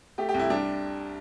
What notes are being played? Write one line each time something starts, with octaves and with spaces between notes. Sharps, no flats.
A3 G4
G4
C2
E4
G3 D4